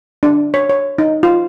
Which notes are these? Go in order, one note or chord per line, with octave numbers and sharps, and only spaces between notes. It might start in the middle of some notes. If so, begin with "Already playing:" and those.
D4
C#5
C#5
D#4
F4